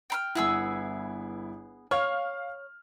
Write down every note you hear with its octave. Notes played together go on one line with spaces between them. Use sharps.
G5 B5 F6
G1 B3 E4 G#4 E6
C#5 F5 F6